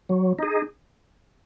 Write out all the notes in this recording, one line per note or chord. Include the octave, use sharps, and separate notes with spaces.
F#3
D#4 G#4